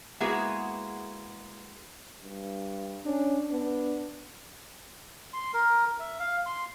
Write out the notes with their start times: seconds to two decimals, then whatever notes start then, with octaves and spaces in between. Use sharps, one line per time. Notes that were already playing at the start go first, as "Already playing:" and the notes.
0.20 G#3 A#3 B3 E4 F#4 G#4
2.23 G2
3.06 C#4 D4
3.51 B3 D4
5.33 C6
5.54 A#4
5.99 E5
6.20 F5
6.46 C6